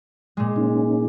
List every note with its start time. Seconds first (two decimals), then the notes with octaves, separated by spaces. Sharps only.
0.37 A#2 G#3
0.56 A#3 C#4 D#4